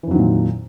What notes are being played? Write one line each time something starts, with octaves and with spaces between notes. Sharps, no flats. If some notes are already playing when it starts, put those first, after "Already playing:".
F2 A#2 D#3 E3 F#3